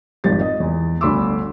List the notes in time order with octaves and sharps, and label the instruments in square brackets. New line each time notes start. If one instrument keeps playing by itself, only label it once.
[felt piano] G#1 F2 G4 A6
D#5
E2
G1 D2 B5 C6 D6 E6